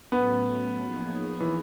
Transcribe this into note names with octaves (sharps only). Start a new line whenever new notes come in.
A2 F#3 A3 B3 C#4
F3 A#3 D#4 G#4 C#5
E3